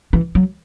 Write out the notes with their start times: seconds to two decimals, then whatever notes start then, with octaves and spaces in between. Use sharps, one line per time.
0.13 E3
0.35 F#3